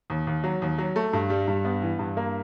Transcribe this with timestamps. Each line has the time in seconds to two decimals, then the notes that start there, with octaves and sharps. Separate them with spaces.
0.10 D#2
0.27 D#2
0.44 F#3
0.62 D#2
0.78 F#3
0.96 A3
1.13 G2
1.30 G3
1.48 G2
1.65 B3
1.82 E3
1.99 G2
2.17 A#3